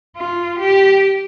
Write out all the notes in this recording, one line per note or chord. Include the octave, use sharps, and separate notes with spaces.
F4
G4